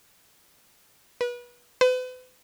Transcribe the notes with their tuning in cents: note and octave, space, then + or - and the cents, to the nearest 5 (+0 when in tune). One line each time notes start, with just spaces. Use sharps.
B4 -30
B4 +40